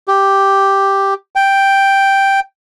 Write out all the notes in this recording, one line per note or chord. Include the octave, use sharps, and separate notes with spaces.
G4
G5